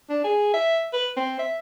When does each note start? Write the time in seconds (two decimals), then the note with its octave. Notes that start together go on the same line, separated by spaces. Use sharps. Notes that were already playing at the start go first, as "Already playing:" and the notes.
0.09 D4
0.24 G#4
0.54 E5
0.93 B4
1.17 C4
1.39 E5